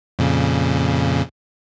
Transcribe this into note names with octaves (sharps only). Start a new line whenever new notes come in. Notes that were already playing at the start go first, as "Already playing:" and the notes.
F2 A#2 C#3